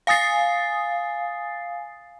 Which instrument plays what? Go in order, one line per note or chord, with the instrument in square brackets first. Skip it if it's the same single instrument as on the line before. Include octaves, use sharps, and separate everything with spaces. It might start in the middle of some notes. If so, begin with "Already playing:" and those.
[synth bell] F5 G#5 D#6 A6 C7